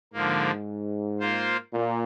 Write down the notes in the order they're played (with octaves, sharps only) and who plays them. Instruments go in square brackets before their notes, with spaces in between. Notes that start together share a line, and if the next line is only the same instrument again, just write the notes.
[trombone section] G#2 [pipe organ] D3 F3 A#3
[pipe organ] A#3 F4 C5
[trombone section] A#2